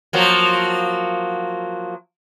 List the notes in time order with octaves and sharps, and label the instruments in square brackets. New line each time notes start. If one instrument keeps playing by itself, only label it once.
[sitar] F3 F#3 A#3